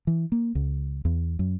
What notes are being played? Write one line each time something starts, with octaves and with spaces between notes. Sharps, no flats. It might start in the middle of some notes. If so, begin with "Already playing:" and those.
E3
A#3
C#2
E2
F#2